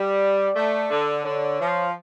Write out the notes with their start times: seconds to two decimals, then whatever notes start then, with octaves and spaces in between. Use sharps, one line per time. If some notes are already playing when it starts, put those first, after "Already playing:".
Already playing: G3 D5
0.56 A3
0.91 D3
1.24 D3 C#5
1.60 F3